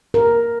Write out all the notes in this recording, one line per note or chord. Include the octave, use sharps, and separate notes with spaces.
A#4